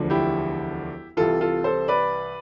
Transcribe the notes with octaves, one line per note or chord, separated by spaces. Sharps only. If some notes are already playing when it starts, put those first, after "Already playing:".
Already playing: E1 D2 D3 F3
E4 G4
C2 C3 E3 F4 A4
F4 A4
A4 C5
B4 D5